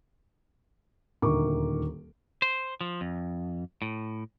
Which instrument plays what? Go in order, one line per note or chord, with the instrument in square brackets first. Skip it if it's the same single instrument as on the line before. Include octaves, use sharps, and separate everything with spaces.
[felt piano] D#1 D2 D#3 A#4 C#6 D6
[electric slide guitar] C5
F3
F2
A2